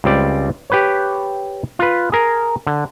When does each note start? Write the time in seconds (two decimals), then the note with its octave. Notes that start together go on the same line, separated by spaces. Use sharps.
0.04 C#2 G3 C4 D5
0.70 G4 B4 C#5
1.79 F4 B4
2.12 G#4 A#4
2.67 D3